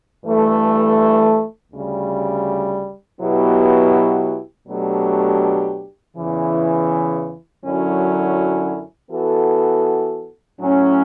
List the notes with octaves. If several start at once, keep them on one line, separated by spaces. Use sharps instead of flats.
G2 E3 A3
D2 C#3 G3
B2 F#3 B3 E4 G4
B2 F#3 A3 D4 G4
E2 C#3 E3
F#2 D3 F#3 C#4 E4
E3 B3 F#4 A4
A2 F#3 C#4